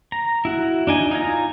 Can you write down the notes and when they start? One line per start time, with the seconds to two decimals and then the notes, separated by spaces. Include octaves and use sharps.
0.12 A#5
0.45 E4 F#4
0.87 D4 D#4 G#5
1.11 D#4 F4 G#5 A#5